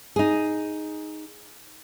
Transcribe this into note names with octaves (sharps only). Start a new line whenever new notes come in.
D#4 G#4